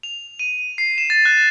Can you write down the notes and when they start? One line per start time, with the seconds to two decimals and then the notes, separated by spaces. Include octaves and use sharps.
0.03 F7
0.39 D#7
0.78 C7
0.98 E7
1.10 A6
1.25 F#6